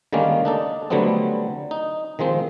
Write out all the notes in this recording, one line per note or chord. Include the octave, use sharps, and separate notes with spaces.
D3 D#3 G3 G#3 A#3 C#4
D4 D#4 A4
D3 F#3 G3 A3 B3 C4
D#4
D#3 F3 G#3 C4